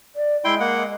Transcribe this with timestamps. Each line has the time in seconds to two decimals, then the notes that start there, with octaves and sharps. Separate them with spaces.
0.15 D5
0.45 G#3 E4 G5 C6
0.60 A#3 F#5